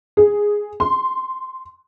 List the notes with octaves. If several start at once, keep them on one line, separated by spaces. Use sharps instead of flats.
G#4
C6